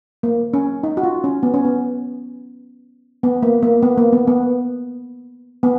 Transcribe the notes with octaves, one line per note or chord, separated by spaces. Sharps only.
A#3
C#4
D#4
F#4
F4
C#4
B3
C#4
B3
B3
A#3
A#3
B3
A#3
B3
B3
B3